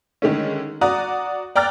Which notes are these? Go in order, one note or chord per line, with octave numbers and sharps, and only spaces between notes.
D3 D#3 G#3 A3 C#4
F#4 D5 A#5 D#6 F#6
D5 G5 A#5 F6 F#6 A6